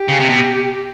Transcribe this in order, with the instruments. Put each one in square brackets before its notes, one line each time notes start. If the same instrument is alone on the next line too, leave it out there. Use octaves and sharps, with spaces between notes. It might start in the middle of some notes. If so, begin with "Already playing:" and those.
Already playing: [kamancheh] G4
[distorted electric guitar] C#3
C3
B2